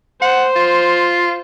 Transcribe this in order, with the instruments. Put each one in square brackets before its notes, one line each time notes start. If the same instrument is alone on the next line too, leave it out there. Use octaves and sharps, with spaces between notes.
[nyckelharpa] C5 [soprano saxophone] F#5
[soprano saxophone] F4